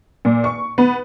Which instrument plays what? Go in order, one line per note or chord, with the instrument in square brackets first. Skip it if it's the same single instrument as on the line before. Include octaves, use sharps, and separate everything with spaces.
[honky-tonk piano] A#2
C#6
B3